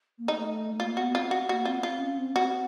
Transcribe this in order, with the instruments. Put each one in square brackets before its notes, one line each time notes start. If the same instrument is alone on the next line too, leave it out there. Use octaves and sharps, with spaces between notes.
[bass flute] A#3
[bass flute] A3 [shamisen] D#4
[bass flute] A3
[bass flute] A#3 [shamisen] F4
[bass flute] B3 [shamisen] F#4
[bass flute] C4 [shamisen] F4
[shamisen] F#4
[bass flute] A#3 [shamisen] F#4
[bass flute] C4 [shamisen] F4
[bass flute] C4 [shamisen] F4
[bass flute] C#4
C4
[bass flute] C4 [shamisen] F#4